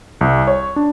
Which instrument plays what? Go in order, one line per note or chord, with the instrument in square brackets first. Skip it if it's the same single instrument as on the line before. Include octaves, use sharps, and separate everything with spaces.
[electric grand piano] C2
C#5
D4